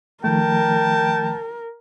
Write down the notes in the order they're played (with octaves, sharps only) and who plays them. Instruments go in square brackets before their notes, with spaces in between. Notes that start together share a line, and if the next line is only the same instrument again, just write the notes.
[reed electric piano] D#3 F3 A3 [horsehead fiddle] A#4 [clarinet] G5 [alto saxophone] A5